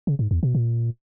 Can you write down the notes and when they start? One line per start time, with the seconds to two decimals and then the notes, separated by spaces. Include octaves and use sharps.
0.07 C#3
0.19 G#2
0.31 E2
0.43 B2
0.55 A#2